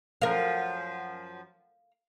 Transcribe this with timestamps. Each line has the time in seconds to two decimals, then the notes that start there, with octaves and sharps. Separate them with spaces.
0.22 F#2 D#3 F3 A#4 F5